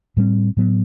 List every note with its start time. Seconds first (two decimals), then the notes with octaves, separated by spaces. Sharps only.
0.17 A2 G3 C4
0.57 A2 F#3 B3